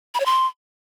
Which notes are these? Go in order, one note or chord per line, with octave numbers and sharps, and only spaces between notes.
B5
C#5
C6